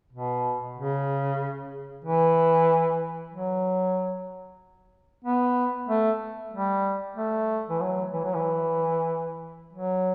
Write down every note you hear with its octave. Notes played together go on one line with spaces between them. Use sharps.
B2
C#3
E3
F#3
B3
A3
G3
A3
E3
F#3
E3
F#3
E3
F#3